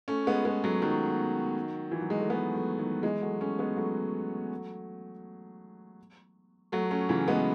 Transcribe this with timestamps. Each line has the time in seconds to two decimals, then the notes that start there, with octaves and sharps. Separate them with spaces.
0.08 A3 C#4
0.27 G#3 B3
0.45 G#3 B3
0.64 F#3 A3
0.82 D#3 F#3
1.92 E3
2.01 F#3
2.10 G#3
2.20 A3
2.30 G#3 B3
2.54 F#3 A3
2.78 D#3 F#3
3.03 E3 G#3
3.22 F#3 A3
3.41 A3 C#4
3.59 G#3 B3
3.77 F#3 A3
6.72 F#3 A3
6.91 A3 C#4
7.09 C#3 E3
7.28 G#3 B3